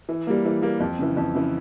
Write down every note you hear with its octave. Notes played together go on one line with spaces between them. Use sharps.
E3
G3 A#3
E3
G3 A#3
F2
C#3 E3
F2
C#3 E3